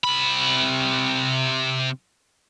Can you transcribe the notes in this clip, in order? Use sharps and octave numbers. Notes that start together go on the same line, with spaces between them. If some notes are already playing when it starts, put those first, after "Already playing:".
C3 B5